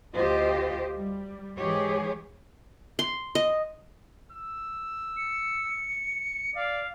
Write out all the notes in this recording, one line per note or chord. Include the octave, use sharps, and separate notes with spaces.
D2 F4 G4 C5 D#5
G3
G#2 E3 G#3 G4 G#4 C#5
C6
D#5
E6
C#7
D5 F5